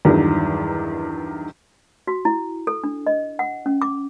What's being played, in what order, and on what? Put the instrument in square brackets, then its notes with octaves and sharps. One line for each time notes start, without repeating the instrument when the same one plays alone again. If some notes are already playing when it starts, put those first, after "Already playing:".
[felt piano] E2 G2 D#3 F#3
[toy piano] F#4
E4
A4
D4
D#5
F#5
C#4
D6